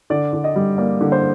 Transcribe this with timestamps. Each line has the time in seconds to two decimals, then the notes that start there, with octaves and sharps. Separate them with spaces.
0.10 D3 D5
0.33 D3
0.44 D#5
0.56 G3
0.78 A#3 D5
1.01 D3
1.12 C5